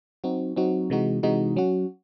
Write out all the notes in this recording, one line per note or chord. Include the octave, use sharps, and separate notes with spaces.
F#3 C4 D#4 F#4
F#3 C4 D#4 F#4
C3 E3 G#3 D#4 F#4
C3 E3 G#3 D#4 F#4
F#3 C#4 F#4